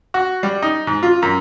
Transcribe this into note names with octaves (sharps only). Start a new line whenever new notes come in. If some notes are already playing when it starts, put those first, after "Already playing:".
F#4
G3
D#4
G#2
F4
F#2